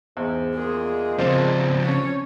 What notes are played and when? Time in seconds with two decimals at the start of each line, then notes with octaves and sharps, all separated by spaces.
0.17 E2 G#2
0.55 A#2 G#3 G#4
1.19 C#2 F3 C4 D5 A5
1.82 C#4 C#5